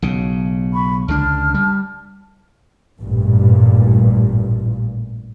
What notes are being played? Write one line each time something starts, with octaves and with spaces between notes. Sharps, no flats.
B1 C#3
B5 C#6
C#2 D3 D4 A5 F6
G3
A1 G2 A#2